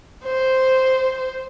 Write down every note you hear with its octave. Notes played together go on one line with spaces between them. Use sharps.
C5